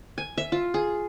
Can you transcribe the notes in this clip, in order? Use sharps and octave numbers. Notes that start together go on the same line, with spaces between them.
G#5
E5
F4
G#4